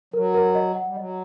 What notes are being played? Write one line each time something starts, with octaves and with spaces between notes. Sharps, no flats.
F#3 A#4
A#4
D#5
F#5
G3
F#3 D#5